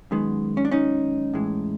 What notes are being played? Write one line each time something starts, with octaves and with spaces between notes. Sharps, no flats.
F#2 D#3 G#3 B3
C#4
D4
C#4 D#4
A2 E3 G#3